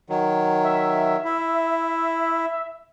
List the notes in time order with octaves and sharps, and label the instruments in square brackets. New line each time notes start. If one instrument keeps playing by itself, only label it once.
[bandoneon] D#3 F#3
[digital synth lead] E5
[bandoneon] E4